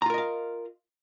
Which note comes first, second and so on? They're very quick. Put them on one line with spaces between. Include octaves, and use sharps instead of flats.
A#5 F4 A#4 D#5 F5